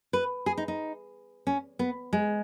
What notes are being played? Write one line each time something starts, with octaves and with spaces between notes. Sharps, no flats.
B4
G#4
D#4
D#4
C#4
B3
G#3